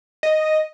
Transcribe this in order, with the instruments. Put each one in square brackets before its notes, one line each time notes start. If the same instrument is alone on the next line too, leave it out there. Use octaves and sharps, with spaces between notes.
[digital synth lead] D#5